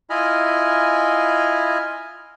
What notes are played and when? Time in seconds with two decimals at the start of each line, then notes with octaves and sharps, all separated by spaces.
0.10 E4 F4 D#5 G#5 B5 F6